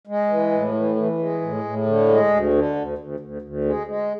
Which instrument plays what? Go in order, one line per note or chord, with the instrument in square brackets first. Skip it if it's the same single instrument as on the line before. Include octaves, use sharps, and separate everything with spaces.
[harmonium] G#3
E3
A2
E3
E3
G#3
A2
A2
D3
G#3
D2
D3
D2
D2
D2
D2
G#3
G#3